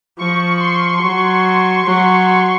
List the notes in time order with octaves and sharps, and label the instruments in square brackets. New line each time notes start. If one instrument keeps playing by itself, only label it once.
[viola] F3 [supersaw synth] C#6
[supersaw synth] C6
[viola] F#3
F#3